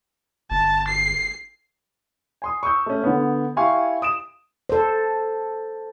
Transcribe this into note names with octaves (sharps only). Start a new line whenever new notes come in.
G1 A5
C7
G#5 C6 D#6
C#6 D#6 E6 G6
A3 C#4
D3 B3
E4 G4 F5 G#5 C6 C#6
D#6 D7 E7
A4 C5